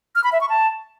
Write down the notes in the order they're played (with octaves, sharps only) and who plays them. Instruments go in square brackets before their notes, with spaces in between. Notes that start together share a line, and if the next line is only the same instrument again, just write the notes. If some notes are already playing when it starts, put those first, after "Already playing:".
[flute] F6
B5
E5
C#6
A5